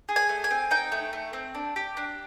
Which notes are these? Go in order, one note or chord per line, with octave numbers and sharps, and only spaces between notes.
G#4
G#5
A3
G#5
C4
D#4 G5
A3
A3
C4
D4
G4
D4